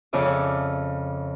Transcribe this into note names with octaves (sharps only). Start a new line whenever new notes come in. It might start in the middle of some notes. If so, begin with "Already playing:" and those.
F2 C#3 F4 D5 E5 D#6